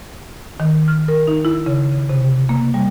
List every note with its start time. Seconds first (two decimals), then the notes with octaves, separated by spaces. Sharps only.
0.60 D#3
0.88 F6
1.08 A#4
1.27 D#4
1.45 E4
1.66 C#3
1.92 C#3
2.09 C3
2.49 A#3
2.74 G3